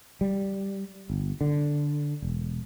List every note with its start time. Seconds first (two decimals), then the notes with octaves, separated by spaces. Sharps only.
0.21 G3
1.10 G1
1.41 D3
2.22 E1